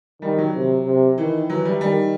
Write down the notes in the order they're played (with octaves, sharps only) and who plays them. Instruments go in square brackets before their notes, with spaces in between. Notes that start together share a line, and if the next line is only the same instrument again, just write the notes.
[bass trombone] D#3 [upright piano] G3
[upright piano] F#3
[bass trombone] C3
C3
[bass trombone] D#3 [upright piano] E3
[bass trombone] E3 [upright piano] F#3
[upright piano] G3
[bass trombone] D#3 [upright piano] G3